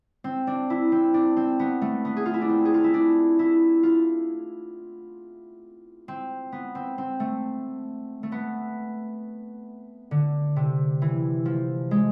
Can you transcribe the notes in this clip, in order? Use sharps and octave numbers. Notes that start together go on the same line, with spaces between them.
C4
D4
E4
C4
D4
C4
B3
A3
B3
G#4
F4
E4
D4
C4
G#4
F4
E4
D4
E4
F4
C4
B3
C4
C4
A3
A3
B3
D3
C3
E3
F3
G#3